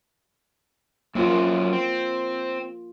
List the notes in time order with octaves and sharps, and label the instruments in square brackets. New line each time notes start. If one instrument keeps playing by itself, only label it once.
[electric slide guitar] F#2 C4 [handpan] A#3 F4
[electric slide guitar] C4